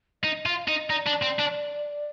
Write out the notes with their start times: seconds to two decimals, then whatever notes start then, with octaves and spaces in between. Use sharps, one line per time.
0.23 D#4 D#5
0.46 F4 F5
0.67 D#4 D#5
0.90 D#4 D5
1.07 D4
1.23 C4
1.39 D4